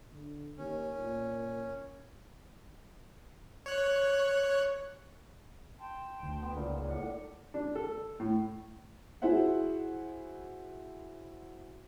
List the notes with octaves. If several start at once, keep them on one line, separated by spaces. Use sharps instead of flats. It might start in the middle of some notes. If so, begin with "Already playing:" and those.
D3
D#2 C#4
A#2
C#5 F#6
G5 A5 C6
D2
B3
C#2 A#2 D#4
A2 D4 F#5
D4
A4
A2
E4 F#4 G#4 C5 E5 F#5